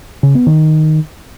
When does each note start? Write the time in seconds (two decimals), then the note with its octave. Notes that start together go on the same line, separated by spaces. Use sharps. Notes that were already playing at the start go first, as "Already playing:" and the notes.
0.23 C#3
0.35 B3
0.47 D#3